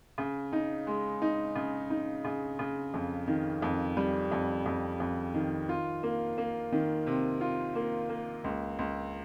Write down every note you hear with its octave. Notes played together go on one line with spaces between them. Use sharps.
C#3
D#4
G#3
D#4
C#3
D#4
C#3
C#3
F2
D#3
F2
G3
F2
F2
F2
D#3
F4
A#3
A#3
D#3
C3
F4
A#3
A#3
C#2
C#2